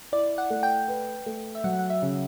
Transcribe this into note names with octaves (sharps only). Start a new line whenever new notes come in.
E4 D5
F#5
A3
G5
B4
A3
E5
F#3 F#5
F#5
E5
C#3